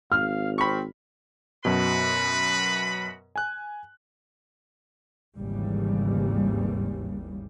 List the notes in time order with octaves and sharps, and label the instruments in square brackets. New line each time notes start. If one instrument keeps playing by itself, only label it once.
[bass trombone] G#1 [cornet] F5 [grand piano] F6
[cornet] C4 [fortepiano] B5 C#6
[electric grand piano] F#2 B2 [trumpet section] F#4 B4 B5
[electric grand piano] G#5 F#6
[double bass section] G#1 D#2 C#3 E3 G3